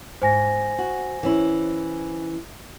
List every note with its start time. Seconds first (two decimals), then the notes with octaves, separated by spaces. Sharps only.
0.22 G#2 C5 G#5 A#6
0.78 F#4
1.23 E3 C#4 E4